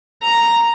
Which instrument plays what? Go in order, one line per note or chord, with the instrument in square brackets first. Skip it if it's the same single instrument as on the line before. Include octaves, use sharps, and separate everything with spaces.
[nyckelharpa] A#5